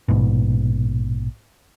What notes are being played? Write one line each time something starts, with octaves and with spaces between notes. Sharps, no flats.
A#1 G#2 B2